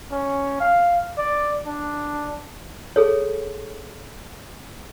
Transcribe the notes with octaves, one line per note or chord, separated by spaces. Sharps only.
C#4
F5
D5
D4
G#4 A4 C#5